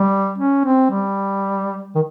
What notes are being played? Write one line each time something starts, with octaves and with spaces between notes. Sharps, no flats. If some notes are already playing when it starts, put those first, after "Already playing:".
Already playing: G3
C#4
C4
G3
D#3